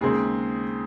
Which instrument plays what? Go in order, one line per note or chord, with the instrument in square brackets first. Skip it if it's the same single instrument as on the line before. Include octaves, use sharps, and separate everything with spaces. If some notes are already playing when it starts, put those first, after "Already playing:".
[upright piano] D#2 C#3 G#3 C4 G#4